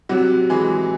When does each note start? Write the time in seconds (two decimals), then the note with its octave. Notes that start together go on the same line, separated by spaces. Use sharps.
0.09 C3 F#3 F#4
0.49 E3 G#3 G#4